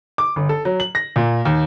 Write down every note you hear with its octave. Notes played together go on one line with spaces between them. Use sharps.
D6
G1
A4
F#3
F#7
A#6
A#2
D#2